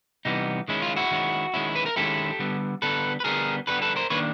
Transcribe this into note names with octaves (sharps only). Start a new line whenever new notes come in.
C3 E3 G3 B3 D#4
D#3 G#3 C#4 E4
F4
E4 F#4
D#3 G#3 C#4 E4
D#3 G#3 C#4 E4
B4
A#4
D#3 G#3 C#4 E4 G4 A4
D3 G3 B3
D3 G3 B3 A4 B4
B4
D3 G3 B3 G#4 A#4
D3 G3 B3 A4 B4
A4 B4
A#4 C5
D#3 G3 A#3 D4 B4 C#5